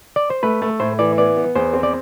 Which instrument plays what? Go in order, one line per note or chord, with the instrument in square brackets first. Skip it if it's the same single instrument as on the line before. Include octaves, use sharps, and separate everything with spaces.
[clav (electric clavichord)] D5
C5
[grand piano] A3 [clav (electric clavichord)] B4
[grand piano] A3
[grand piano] A2 [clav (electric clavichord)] C5
[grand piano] E3 [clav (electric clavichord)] D5
[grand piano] B3 [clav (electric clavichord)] D5
[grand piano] B3
[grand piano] E2 [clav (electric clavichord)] C5
[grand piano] C4
[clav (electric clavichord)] D5